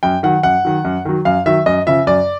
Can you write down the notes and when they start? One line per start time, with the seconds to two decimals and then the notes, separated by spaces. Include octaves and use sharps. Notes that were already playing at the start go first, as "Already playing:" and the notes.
0.03 F#2 G5
0.23 D#3 F#3 F#5
0.43 F#2 F#5
0.65 D#3 F#3
0.85 F#2
1.05 D#3 F#3
1.25 F#2 F5
1.46 D#3 F#3 E5
1.66 F#2 D#5
1.87 C#3 F3 E5
2.07 F#2 D5